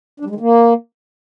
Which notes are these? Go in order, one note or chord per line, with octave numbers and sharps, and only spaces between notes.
D4
G3
G#3
D#3
A#3